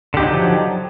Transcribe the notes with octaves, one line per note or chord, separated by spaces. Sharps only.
D3 F3 F#3 D#4 G4